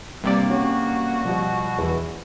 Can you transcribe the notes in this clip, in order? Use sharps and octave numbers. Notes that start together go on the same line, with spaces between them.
G2 C3 A#3 G4 D5
F#3 C#4 F#4 G4
B2 F3 G3
E2 E3